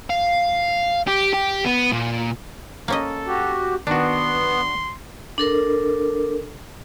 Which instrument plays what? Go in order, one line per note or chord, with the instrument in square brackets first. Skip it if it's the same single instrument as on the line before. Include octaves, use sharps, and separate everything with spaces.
[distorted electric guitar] F5
G4
G4
B3
A#2
[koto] A#3 C#4 D#5 [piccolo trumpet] A4
[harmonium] F#4 G4
[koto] D#3 [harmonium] B3 [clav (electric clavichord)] D4 F#4 [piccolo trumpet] C6
[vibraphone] D4 A4 A#4